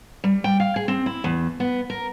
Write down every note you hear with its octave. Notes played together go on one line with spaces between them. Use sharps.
G3
G5
F5
G#4
C4
E4
E2
B3
A#4